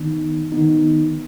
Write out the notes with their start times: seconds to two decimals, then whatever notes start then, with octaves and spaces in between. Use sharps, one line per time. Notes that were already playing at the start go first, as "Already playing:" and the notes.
Already playing: D#3 B3 D#4
0.52 D#3 B3 D#4